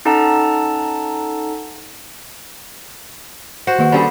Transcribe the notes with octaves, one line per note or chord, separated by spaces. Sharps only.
C#4 D#4 A4 F#5 A5 A#5
F#4 C5
D#3 A#3 B4
D3 G3 C#4 G#4 B5